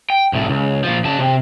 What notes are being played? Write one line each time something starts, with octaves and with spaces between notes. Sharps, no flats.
G5
C2 A2
C#2
A#2 F3
C#3 A5
C3